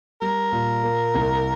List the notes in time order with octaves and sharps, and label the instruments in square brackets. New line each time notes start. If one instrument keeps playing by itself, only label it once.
[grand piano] G3 [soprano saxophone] A#4
[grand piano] A#2
A#3
C2